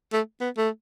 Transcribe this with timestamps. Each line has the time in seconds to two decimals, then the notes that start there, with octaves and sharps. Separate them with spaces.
0.13 A3
0.41 B3
0.58 A3